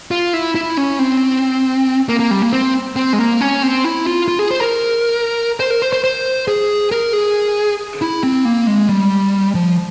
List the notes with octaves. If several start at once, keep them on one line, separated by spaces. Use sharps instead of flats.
F4
E4
E4
C#4
C4
A#3
A#3
G3
A#3
C4
C4
G#3
A#3
C#4
C4
E4
F4
F4
G#4
C5
A#4
C5
A#4
C5
C5
C5
G#4
A#4
G#4
E4
C4
A#3
G#3
G3
F3